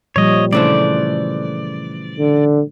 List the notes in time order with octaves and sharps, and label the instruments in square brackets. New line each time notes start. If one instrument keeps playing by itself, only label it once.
[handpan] A#2 F3 G3 [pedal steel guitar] C#5 D#5
[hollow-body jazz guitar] C#3 E3 D4 [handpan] A3 C5 [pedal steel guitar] D5
[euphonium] D3